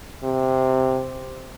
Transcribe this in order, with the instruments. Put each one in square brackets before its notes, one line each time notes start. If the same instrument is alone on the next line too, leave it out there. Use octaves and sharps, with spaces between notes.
[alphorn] C3